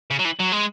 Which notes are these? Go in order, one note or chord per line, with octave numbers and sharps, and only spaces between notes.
C#3
F#3
E3
F#3
G#3